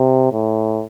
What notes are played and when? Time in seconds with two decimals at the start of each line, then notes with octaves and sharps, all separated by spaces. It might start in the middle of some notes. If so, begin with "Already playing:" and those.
Already playing: C3
0.32 A2